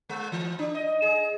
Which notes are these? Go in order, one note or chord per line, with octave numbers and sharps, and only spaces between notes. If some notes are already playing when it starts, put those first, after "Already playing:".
G#3
E3
D4
D#5
G#4